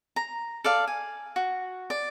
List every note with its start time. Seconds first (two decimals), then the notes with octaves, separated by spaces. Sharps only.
0.16 A#5
0.64 A4 D5 F5
0.87 G#5
1.36 F#4
1.90 D5